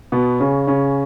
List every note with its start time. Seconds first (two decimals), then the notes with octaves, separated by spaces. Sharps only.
0.12 B2 B3
0.40 C#3 C#4
0.67 C#3 C#4